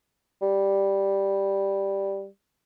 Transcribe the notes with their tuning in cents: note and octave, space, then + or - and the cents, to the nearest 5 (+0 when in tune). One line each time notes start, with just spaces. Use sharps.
G3 +0